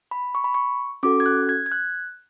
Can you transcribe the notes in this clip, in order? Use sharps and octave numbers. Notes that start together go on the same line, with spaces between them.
B5
C#6
B5
C#6
C#4 F#4 A4 D6
G#6
F#6
G#6
G#6
F#6